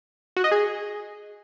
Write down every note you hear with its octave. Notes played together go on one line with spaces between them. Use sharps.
F#4
D#5
G#4